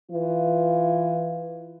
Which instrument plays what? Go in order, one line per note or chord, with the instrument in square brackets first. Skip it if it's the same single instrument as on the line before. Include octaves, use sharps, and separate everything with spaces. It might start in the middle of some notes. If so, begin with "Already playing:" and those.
[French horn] E3 [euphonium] F4